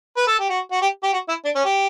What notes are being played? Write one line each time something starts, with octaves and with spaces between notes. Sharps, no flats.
B4
A4
G4
F#4
F#4
G4
G4
F#4
E4
D4
C#4
G4